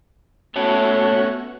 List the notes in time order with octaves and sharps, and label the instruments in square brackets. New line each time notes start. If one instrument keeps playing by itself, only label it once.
[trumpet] A3 [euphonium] B3 [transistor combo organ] C#4 F#4 [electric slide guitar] C#5 E5 A5